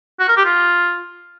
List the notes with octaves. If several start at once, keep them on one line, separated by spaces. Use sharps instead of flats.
F#4
A#4
G4
F4